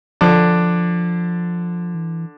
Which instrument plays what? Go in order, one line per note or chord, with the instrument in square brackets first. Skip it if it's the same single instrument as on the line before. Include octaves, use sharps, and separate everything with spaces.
[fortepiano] D3 D4 [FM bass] F3
[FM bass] E3